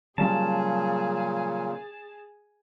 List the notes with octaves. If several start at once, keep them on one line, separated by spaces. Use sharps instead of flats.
A#2 C#3 F#3 G3 C#4 G#4 A5